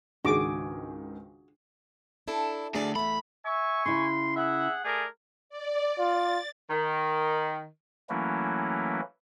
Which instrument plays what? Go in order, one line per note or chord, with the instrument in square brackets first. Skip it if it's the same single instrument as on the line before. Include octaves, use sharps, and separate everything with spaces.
[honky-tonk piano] C#2 G#2 D#3 [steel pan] D4 D6 [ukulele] F#4 G#4
[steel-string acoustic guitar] D4 E4 A4
[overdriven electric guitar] A3 D4 [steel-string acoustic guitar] G#4 A4 D5
[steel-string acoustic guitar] E2 A3 [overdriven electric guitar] B5
[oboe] E5 [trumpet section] G#5 C#6
[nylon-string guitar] C#3 E4 [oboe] C6
[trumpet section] G#4 F#5 [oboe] E5
[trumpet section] A3 A#4 D5 [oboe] G#4
[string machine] D5
[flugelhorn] F4 [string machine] A6
[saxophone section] D#3
[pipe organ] E3 F#3 A3 A#3 C#4 E4